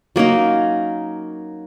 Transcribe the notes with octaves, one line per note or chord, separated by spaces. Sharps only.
F#3 A#3 C#4 D#4